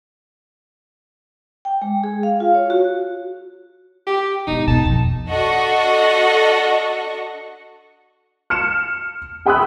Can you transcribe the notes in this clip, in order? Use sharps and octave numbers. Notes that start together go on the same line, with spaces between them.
G5
G#3
G#4
F5
F4
C#5
F#4
G4
E1 D#4
B2 A5
F2
D4 F#4 A4 D#5 F#5 C#6
F6 C#7 E7
G#4 G5 B5 D#6 E6 F#6